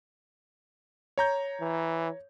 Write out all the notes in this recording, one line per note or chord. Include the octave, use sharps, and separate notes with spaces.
C#5 A#5 G6
E3